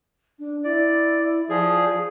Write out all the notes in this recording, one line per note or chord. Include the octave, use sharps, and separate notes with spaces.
D4
E4 D5
F3 G#4 D5